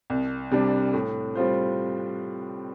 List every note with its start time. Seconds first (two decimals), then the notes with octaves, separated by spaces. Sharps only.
0.10 C2
0.51 C3 G3 D4
0.94 A2
1.35 G3 C4 F4 C5